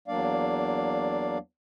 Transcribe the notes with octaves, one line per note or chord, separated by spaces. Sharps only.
E2 F#3 A#3 D4 D5 F5